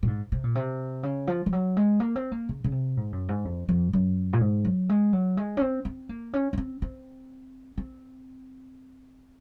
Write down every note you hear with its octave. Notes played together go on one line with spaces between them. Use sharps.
A#2
G#2
C3
A#2
C3
C#3
F3
F3
F#3
G#3
A#3
C4
A#3
C#3
C#3
C3
G#2
F#2
G#2
F2
F2
F#2
A#2
G#2
F#3
G#3
F#3
G#3
C#4
C4
C4
A#3
C#4
C#4
C4
C4
C4